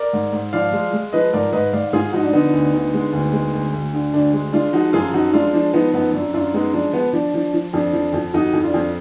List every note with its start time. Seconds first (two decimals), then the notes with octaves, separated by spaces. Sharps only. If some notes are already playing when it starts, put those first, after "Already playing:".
Already playing: A#4 D5
0.13 G#2
0.32 G#2
0.53 F3 D5 F5
0.73 G#3
0.93 G#3
1.13 F3 B4 D#5
1.33 G#2 A#4 D5
1.52 G#2 B4 D#5
1.73 G#2 D5 F5
1.93 G#2 F4 G#4
2.13 F3 D#4 F#4
2.23 D4
2.33 D3 B3 D#4
2.53 D2
2.74 D3
2.94 G#3
3.13 D2
3.33 G#3
3.53 D2
3.74 D2
3.93 D3
4.13 D2 D4
4.33 G#3
4.53 G#3 D4 F4
4.73 F3 D#4 F#4
4.93 F#2 F4 G#4
5.13 F3 D#4 F#4
5.33 G#3 D4 F4
5.53 F3 D4
5.73 F3 B3 D#4
5.93 F#2 B3 D#4
6.13 F#2 D4
6.34 F#2 D4 F4
6.54 G#3 B3 D#4
6.73 F3 D4
6.93 F3 B3
7.13 F3 D4
7.34 F3
7.54 F3
7.73 F2 D4
7.93 F3
8.13 F2
8.34 F2 D#4 F#4
8.53 F2
8.64 D4 F4
8.74 F2